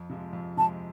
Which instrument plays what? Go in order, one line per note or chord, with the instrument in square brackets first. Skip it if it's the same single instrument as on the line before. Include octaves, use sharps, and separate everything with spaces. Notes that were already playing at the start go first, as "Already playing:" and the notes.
Already playing: [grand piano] F2
C3 F3 G#3
F2
[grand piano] C3 F3 G#3 [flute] A5